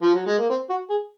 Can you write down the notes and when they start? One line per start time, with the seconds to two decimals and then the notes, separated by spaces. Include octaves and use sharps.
0.02 F3
0.14 F#3
0.26 G#3
0.39 A#3
0.50 C4
0.70 F#4
0.90 G#4